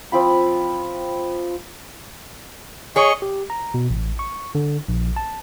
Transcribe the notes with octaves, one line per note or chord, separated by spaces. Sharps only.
F3 C4 F4 B5
G#4 C#5 D#5 C#6
G4
A#5
B2
A1
C#6
D3
A#1
A5